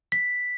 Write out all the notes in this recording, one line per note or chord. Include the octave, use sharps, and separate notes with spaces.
B6